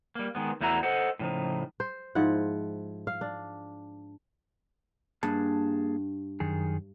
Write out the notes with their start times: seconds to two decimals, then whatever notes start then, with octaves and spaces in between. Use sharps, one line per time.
0.15 G3 A#3
0.35 D#3 G#3 B3
0.61 E2 A3 E4 F#4 A#5
0.83 A4 C5 D#5 F#5
1.19 A2 C#3 F3 D#4
1.80 C5
2.15 G#2 F3 E4 F#5
3.07 F5
3.21 D4
5.23 G2 A#3 G#4 A5
6.40 F#2 D#3 G#4